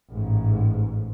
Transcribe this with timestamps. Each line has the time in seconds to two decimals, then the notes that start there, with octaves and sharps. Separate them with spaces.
0.11 A1 G#2